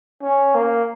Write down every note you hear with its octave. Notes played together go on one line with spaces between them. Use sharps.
C#4
A#3